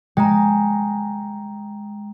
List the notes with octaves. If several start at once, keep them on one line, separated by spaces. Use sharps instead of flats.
G#3 G5 A#5